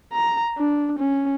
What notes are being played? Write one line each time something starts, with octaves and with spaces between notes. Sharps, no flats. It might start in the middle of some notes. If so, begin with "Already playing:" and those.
A#5
D4
C#4